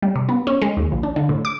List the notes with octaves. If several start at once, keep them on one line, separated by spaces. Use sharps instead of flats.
G3
C3
B3
C#4
G#3
D#2
A#1
D4
D3
A2
D6